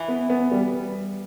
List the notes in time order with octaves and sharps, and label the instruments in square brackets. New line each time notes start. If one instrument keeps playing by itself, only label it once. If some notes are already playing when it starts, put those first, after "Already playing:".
Already playing: [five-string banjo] E3
[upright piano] B3
B3
G3